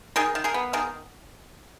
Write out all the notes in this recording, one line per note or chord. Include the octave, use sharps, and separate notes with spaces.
D#3 G#4 A#4
D#3
G#4 A#4
B3
D#3 G#4 A#4